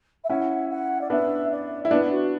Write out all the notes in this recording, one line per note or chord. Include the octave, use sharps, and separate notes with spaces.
E5
C#4 E4 F#5
F#5
D5
B3 D4 E5
D5
E4 E5
B3 D4 D5
F#4